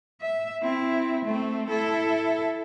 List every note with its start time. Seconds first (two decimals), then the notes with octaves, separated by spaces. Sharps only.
0.21 E5
0.62 C4 E4
1.25 A3 C4
1.70 E4 A4